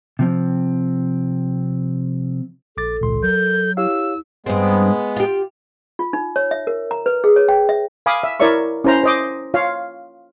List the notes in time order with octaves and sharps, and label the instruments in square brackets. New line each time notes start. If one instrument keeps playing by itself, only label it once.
[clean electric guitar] C3 F3 C4
[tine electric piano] A#1 D6 A6 [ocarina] A4
[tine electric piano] G#1 C#2 C6 [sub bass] A#2
[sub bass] F#3 [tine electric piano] A#4 [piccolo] G6
[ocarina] E4 [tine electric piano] G4 C#5 F5 [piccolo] E6
[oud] G2 C4 [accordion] G#3 B3
[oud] F4 G4
[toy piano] F4
D#4
C#5
E5
A#4
A#5
B4
G#4
C#5
G5
E5
[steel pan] F5 G#5 B5 D6 D#6
E5
E4 A#4 C#5 D5 E5 C#6
C#4 E4 C5 A#5
C5 D#5 D6
F4 C#5 F5